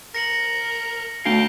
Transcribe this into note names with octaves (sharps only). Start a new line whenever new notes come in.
A#4 A#6 C#7 F#7
D2 F5 G5 A5